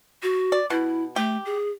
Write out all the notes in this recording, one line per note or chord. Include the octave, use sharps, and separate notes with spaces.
F#4
D5
B2 E4
A3 G4
G#4